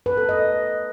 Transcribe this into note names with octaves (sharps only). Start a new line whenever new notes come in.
B4
A4
D#5